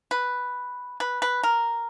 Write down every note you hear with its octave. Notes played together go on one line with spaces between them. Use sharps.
B4
B4
B4
A#4